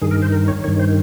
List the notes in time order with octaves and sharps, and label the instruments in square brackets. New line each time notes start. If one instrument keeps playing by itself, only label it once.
[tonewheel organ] G2 D#3 G#4
A#4
C5
A#4
C#5
G2 D#3 C#5
C5